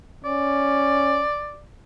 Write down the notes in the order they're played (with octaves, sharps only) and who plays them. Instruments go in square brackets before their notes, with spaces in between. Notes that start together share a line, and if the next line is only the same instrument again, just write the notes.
[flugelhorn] C#4 [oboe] D5